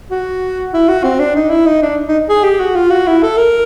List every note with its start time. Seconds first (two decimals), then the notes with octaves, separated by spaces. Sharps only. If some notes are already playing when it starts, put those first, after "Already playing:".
0.11 F#4
0.73 E4
0.88 F#4
1.04 C4
1.19 D4
1.36 D#4
1.50 E4
1.66 D#4
1.82 D4
2.08 D#4
2.29 G#4
2.44 G4
2.60 F#4
2.75 F4
2.90 F#4
3.07 E4
3.23 A4
3.37 A#4